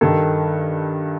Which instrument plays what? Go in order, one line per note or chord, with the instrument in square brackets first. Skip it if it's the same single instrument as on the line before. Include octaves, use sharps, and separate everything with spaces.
[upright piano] G2 D#3 A4